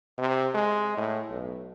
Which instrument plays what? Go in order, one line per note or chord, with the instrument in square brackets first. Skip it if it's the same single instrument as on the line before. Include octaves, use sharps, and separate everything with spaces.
[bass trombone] C3
G#3
A2
B1